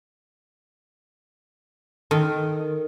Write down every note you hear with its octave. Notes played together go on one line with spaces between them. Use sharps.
D#3 A4